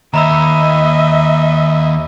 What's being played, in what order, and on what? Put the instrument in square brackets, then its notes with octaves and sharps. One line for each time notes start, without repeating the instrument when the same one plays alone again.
[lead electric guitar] D#2 [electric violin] D#5 E5 [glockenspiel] A#5 B5 E6